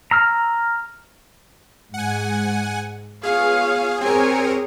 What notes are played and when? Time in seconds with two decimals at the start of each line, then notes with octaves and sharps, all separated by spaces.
0.11 A#5 E6 F6
1.94 G#2 F#5 G#5
3.23 B3 F4 G#4 C#5 F5
4.01 C4 G4 G#4 A#4 C#5 G#5